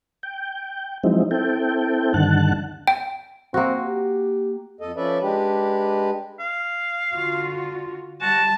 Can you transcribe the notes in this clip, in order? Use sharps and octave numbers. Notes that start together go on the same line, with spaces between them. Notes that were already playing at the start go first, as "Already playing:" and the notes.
G5
F3 F#3 G#3 C4 D#4 E4
C4 E4 A4 G5
G2 D3 D#3 F#5 A5 F#6
G5
A#3 C4 F#4
G4
F2 A4 D#5
F3 C#4 A4 B4 D5 E5
G#3 D4 G4 B4
F5
D3 F4 F#4
G3 F#4 A5